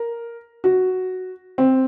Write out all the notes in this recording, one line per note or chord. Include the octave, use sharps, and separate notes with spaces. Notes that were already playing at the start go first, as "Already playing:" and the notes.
Already playing: A#4
F#4
C4